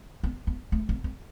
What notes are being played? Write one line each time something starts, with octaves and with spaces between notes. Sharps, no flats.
B3
B3
A3
B3
B3